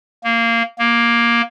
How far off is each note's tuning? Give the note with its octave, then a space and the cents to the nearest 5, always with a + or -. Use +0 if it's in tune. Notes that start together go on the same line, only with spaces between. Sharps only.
A#3 -15
A#3 +10